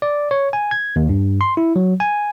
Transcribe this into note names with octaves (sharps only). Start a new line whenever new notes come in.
D5
C#5
G#5
G#6
D#2
G2
C6
E4
F#3
G#5